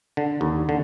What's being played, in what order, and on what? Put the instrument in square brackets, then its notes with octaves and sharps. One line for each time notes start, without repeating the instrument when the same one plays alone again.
[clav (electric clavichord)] D3
D#2
D3